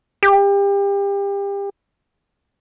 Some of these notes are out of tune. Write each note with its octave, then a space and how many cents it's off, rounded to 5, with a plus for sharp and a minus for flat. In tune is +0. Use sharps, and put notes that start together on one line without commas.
G4 +30